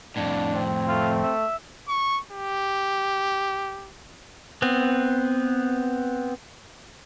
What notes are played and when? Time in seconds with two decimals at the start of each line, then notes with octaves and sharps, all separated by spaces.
0.16 F2 A2 D4
0.53 C4
0.88 A3 F4
1.23 E5
1.88 C#6
2.31 G4
4.62 B3 C4